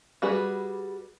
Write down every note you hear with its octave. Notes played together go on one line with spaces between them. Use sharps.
G3 F#4 G#4 B4